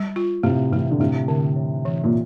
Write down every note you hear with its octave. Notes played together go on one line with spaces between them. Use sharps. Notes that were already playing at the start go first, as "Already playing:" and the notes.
Already playing: G3
F4
A2 C3 A3
C3 E3 A3
D3
A2 C3 A3
D3
E3
E3
A#2